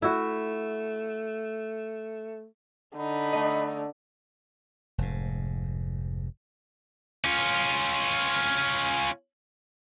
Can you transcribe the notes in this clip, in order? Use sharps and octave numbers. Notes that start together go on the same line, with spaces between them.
A3 E4 F#4
D3 D#4 B5
A3 D#5
F1 G#2
C#4 F4